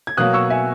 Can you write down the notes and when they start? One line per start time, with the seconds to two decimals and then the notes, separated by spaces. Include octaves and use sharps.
0.07 G#6
0.17 B2 F#3 A#3 D#6 F#6
0.34 C#6 E6
0.50 E5 G#5